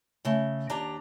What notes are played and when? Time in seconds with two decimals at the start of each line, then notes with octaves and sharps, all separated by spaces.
0.25 C#3 A3
0.70 D#2 D4 G4 A#5